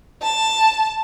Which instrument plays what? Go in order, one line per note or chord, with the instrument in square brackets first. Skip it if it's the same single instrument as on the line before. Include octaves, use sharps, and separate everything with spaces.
[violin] A5